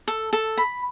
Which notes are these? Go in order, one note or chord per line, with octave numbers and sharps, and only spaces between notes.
A4
A4
B5